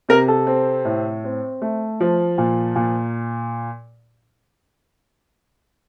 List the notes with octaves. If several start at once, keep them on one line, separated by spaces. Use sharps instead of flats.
C3 A#4
A4
C4
A2
C4
A3
F3
A#2
A#2